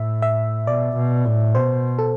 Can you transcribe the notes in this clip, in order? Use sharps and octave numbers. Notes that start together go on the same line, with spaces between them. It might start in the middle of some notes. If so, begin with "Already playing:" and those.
Already playing: A2 E5
E5
B2 D5
B2
A2
B2 C5
A4